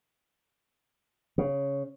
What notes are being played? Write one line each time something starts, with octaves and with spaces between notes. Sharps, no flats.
C#3